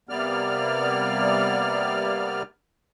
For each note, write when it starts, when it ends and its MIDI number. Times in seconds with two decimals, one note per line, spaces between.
0.09 2.42 48
0.09 2.42 55
0.09 2.42 58
0.09 2.42 59
0.09 2.42 74
0.09 2.42 89